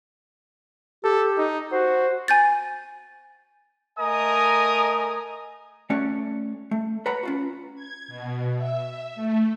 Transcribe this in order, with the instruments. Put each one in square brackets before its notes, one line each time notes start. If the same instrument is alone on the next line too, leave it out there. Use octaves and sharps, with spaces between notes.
[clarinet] G4 [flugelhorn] A4
[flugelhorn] D#4
[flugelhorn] F#4 [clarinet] C5
[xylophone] G#5 G6 A6
[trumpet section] A3 A#4 D#5 G#5 A#5 D#6
[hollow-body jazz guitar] A3 C#4 F#4 C#5 D5
A3
B4 C#5 F#5 A#5 B5
C#4 F4 F#4
[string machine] G#6
B2
E5
A3